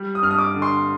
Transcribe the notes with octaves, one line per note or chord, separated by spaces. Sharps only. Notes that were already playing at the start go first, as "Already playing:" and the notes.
Already playing: G3
D#6
G2 F6
D#6
D6
D3
C6